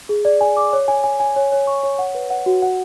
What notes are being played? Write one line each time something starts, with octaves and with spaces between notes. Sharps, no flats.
G#4
D5
G#5
D6
C#5
G#5
G#5
G#5
C#5
C#5
C#6
C#5
F#5
B4
F#5
F#4
F#5